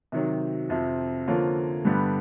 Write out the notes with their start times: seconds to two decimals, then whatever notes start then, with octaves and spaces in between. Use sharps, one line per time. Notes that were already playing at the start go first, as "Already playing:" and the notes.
0.12 C3 D#3 F#3
0.69 F2 C3 F3
1.27 D3 F3 A#3 C#4 F4
1.85 G2 D3 G3 B3